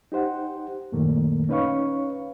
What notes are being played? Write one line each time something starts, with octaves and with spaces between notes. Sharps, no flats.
D#4 G4 C5 F#5
F#2 A#2 D#3 A3 A#3
C#4 D#4 B4 C#5 F5 C#6